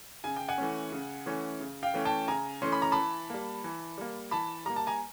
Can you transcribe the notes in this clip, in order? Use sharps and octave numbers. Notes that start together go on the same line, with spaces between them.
C#3 G#5
G5
F#5 G#5
E3 A3 C#4
C#3
E3 A3 C#4
C#3
F5 G5
E3 A3 C#4
G5 A5
C#3 G#5 A#5
E3 A3 C#4 C6
B5
A#5
E3 A5 B5
G3 A#3
E3
G3 A#3
E3 A5 B5
G3 A#3 A#5
A5
G#5 A#5